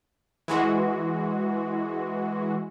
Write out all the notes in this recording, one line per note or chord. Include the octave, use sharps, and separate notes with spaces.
E3 G#3 F#4